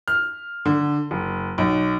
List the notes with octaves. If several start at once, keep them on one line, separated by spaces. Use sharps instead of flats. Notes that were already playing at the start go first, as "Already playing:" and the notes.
F6
D3
F#1
B1